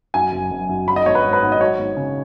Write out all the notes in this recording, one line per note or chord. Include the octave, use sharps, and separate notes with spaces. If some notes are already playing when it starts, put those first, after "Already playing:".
F#2 G#5
F#1
F#1
F#2
F#3 B5
D#5
G#1 C#5
B4
G#2
B4
G#1
D#5
F#3 C#5
G#1
C#3